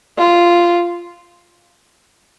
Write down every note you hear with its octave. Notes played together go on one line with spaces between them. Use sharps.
F4